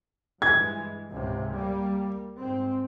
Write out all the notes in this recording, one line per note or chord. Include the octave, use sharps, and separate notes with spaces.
G2 E3 G#3 G#6
C#2 G#2 C3
G3 A#3
G#2 C4